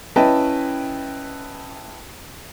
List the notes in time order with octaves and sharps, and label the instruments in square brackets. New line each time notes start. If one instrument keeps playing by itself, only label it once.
[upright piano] C#4 E4 B4 D#5 G5 A5